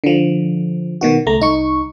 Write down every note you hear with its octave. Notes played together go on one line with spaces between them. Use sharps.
D3 F3
B2 D#3 F#4
C#2 A3 A#5
C2 D#4 C#6